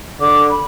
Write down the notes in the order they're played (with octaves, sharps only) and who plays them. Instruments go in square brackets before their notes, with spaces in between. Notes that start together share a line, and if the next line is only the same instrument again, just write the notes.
[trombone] D3 [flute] D6
[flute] B5